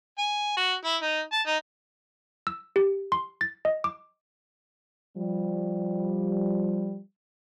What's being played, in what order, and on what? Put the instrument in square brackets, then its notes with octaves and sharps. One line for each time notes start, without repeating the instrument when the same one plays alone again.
[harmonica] G#5
F#4
E4
D#4
A5
D#4
[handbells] E6
G4
C6
A6
D#5
D6
[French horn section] F3 G3